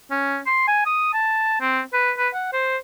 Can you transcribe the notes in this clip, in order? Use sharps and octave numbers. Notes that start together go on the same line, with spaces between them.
C#4
C6
G#5
D#6
A5
C4
B4
B4
F#5
C5